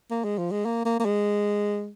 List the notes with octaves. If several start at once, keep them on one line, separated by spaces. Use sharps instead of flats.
A#3
G#3
F3
G#3
A#3
A#3
A#3
G#3